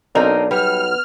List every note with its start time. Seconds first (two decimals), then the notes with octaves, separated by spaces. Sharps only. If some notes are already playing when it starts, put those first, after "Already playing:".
0.15 B1 C4 D4 D#4 A#4
0.51 G3 B3 F6